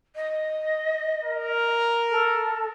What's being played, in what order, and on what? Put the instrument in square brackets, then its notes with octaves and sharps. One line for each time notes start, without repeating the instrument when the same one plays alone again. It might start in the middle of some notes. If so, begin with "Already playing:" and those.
[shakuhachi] D#5
[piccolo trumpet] A#4
[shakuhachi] A4